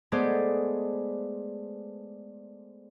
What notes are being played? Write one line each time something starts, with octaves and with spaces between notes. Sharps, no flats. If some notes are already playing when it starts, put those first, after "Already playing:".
G#3 A3 B3 G#4 C5 D5